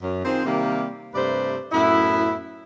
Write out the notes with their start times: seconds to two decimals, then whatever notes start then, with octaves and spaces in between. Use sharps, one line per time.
0.01 F#2
0.25 D#3 C4 F4 G#4 C5
0.45 C3 D#3 G3 A#3
1.14 G2 C3 A3 B4 C5 D5
1.72 F#2 A2 B3 E4